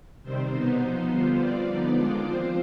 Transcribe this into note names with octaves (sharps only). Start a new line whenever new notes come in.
C3 D#3 G3 C4 C5
B2 B3 D#4
F3 B3 D#4
D3 G3 B3 F4
G3 C4 F4 D5
D3 F3 B3 D#4
D#3 G#3 D4 F4
F3 C4 F4 C5